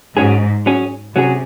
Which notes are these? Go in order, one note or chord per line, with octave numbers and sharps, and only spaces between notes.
G#2 F#3 C#4 G#4
F#3 C#4 G#4
C3 F#3 C#4 G#4